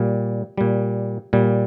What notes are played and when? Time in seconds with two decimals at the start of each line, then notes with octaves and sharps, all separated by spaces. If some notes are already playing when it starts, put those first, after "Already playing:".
Already playing: A#2 G3
0.57 A#2 G3
1.33 A#2 G3